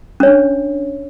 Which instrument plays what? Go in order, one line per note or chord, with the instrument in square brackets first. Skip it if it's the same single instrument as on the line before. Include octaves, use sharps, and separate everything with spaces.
[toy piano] C#4
C#5
D4